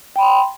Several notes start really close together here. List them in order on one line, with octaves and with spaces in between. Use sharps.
G5 B5 C6